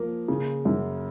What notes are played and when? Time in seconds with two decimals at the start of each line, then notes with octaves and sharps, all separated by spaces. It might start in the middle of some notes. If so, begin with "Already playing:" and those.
Already playing: F3 A#3
0.28 C#3
0.65 F#2